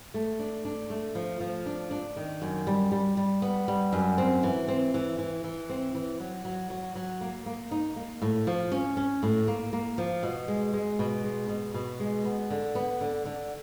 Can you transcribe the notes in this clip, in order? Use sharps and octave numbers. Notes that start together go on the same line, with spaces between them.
A3
D4
D4
A3
F3
F3
D4
D4
D#3
F#2
G3
G3
G3
B3
G3
F#2
C4
E3
C4
E3
E3
E3
C4
E3
F#3
F#3
F#3
F#3
A#3
A#3
D#4
A#3
A2
F3
C#4
C#4
A2
A#3
A#3
F3
B2
G#3
G#3
B2
G#3
B2
B2
G#3
B3
D3
B3
D3
D3